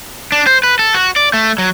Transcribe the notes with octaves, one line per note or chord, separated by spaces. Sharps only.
D4
C5
B4
A4
F#4
D5
A3
F#3